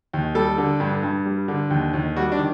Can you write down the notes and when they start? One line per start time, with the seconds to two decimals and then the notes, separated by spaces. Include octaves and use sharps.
0.13 D#2
0.35 G3 A4
0.58 D3
0.80 G2
1.03 G2
1.26 G3
1.48 D3
1.71 D#2
1.94 D#2
2.16 G3 F#4
2.32 D4
2.39 D#3